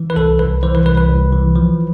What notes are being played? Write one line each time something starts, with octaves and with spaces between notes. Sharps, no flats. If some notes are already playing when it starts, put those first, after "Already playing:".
Already playing: E3
B4
C2 A4
C2 B4
E3 C5
B4
C2 B4
B4
C2
E3
F3